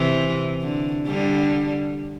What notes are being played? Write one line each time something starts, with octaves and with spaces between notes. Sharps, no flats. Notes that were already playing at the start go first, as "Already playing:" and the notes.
Already playing: C3 E3
D3
D3 G3